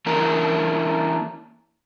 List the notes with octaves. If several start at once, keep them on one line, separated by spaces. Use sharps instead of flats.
E3 A#3 C#4 D4 E4 A#4